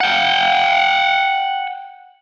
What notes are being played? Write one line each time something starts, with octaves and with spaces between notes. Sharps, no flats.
F#5 G5